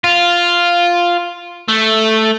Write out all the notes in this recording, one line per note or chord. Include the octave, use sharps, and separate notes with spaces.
F4
A3